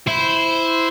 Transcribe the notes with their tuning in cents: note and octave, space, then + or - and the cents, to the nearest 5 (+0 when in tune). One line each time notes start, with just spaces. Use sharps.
E4 +0 C5 -10